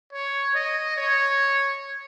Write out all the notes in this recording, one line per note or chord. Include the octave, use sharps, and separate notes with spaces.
C#5
D#5
C#5